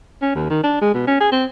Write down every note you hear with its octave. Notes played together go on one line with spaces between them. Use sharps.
C#4
D#2
D#3
D4
G#3
B2
C#4
G#4
C4